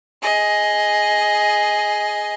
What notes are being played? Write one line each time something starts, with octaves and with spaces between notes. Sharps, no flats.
G#4 D#5